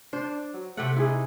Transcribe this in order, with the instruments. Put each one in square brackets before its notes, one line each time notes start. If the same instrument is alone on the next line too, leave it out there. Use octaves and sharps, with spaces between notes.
[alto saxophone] D4 [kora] C5
[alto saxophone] F#3
[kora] C3 G4 F#5 [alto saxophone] A3
[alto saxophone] D#4 [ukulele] E4 G#4